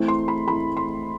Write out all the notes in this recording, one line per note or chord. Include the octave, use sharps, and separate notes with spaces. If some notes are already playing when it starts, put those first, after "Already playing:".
Already playing: E3 A3 C4 E4
C6
B5
E3 A3 C4 E4 B5
C6